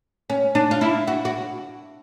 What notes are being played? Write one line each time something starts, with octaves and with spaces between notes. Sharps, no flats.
C#4
D4
F4
E4
F#4
F#4